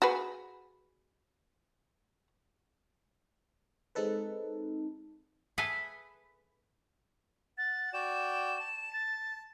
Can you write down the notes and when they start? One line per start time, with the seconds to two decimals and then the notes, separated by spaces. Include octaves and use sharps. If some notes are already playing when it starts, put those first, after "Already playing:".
0.02 F#4 G#4 B4
3.95 G#3 C4 D#4 A4 B4
5.58 G#4 A4 B4 E5 G#5
7.58 F#5 A6
7.94 F#4 D5 G5 E7
8.60 A5
8.93 A6